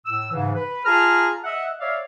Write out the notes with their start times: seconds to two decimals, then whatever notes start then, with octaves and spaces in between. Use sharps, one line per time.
0.06 A2 E6
0.32 G#2 C#3 E3
0.55 B4
0.85 F4 G#4 A5 A#5 F6
1.44 D#5 E5 F#5
1.80 C#5 D5 E5 F5